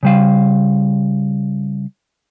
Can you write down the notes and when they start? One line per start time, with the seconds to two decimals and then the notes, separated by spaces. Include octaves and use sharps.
0.03 C#3 G3 F5